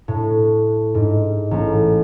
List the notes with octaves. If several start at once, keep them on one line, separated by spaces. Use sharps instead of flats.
A2
G#2
A1